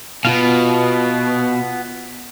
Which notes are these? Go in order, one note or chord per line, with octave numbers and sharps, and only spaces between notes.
B2 B3 F4 F5